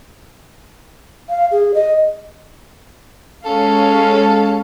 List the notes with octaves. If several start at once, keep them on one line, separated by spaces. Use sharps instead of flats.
F5
G#4
D#5
G#3 C#4 A4 F5